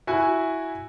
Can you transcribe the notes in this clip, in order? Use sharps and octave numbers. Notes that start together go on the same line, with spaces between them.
E4 F#4 G#5